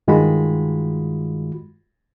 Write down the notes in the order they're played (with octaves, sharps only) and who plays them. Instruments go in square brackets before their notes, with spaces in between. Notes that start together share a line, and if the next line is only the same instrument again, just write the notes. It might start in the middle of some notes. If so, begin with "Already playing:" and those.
[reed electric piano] G2 D#3 G#3 F4 F#4 B5